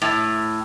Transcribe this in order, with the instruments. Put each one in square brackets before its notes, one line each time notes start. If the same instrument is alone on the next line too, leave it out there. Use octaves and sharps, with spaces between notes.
[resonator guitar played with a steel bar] A2